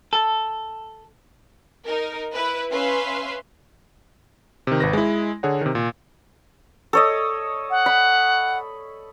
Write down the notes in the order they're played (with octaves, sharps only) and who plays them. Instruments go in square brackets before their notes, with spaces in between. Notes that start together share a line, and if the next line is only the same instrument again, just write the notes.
[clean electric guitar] A4
[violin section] D#4 A#4
E4 B4
C#4 B4 E5 F5 C6
[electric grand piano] C3 D#3
G#1 B4 A#6
G#3 E4
D3 G#4 C#5 F#5
C3 D#3
A#2
[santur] A4 C#5 D#5
[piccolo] F#5
[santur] B5